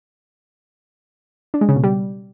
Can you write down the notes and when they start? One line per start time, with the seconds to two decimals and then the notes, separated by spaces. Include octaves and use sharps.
1.54 D4
1.61 G#3
1.69 C#3
1.76 B2
1.84 G3